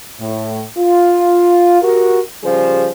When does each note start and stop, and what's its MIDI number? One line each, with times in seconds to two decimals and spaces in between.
0.20 0.62 45
0.78 1.79 65
1.82 2.19 66
1.82 2.19 67
1.82 2.19 70
2.44 2.88 49
2.44 2.88 53
2.44 2.88 55
2.44 2.88 67
2.44 2.88 68
2.44 2.88 72